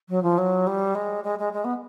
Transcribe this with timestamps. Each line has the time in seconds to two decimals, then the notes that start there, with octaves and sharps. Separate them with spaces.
0.09 F#3
0.22 F3
0.38 F#3
0.67 G3
0.95 G#3
1.24 G#3
1.39 G#3
1.53 G#3
1.64 B3